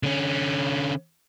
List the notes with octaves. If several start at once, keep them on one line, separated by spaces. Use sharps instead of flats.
D3 C#4